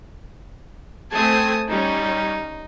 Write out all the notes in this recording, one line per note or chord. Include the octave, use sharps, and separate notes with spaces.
A3 C4 G#5 A5 D#6
G3 C#4 D#4